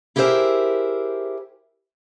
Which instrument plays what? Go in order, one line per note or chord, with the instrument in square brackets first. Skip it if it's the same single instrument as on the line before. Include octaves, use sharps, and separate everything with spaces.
[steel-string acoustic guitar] E4 G4 G#4 A#4 C5 E5